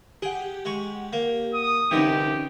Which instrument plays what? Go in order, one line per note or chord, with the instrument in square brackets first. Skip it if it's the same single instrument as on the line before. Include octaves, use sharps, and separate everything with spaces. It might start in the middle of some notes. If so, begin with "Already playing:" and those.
[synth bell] G4 F#5 [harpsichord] G#4
[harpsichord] G#3 C#6
A#3
[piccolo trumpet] D#6
[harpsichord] C2 D3 E3 [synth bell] C#4 D#4 [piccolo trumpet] G4